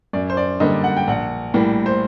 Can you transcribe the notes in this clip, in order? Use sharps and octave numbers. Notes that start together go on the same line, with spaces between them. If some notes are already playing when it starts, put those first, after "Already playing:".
F#2 D5
C5
D5
D3 G3 A#3 D#5
F#5
G5
A#1 F#5
A2 G3 A#3
C5